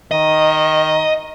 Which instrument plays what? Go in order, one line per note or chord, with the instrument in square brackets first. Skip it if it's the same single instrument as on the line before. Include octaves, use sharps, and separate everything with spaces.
[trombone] D#3 [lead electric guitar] D#5